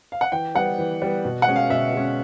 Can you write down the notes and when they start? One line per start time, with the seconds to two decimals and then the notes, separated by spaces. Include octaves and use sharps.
0.12 F5
0.21 F#5
0.32 E3 G5
0.55 G3 B3 F#5
0.78 E3
1.02 G3 B3
1.25 B2
1.42 F#5
1.47 G#3 C#4
1.56 F5
1.70 B2 E5
1.93 G#3 C#4